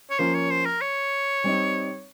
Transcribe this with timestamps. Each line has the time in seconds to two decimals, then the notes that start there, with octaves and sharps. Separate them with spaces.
0.11 C#5
0.19 F3 A#3 C#4 C5
0.34 C#5
0.51 C5
0.66 A#4
0.82 C#5
1.44 G3 C4 D#4